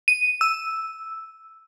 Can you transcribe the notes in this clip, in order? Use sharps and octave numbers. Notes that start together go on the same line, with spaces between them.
D#7
E6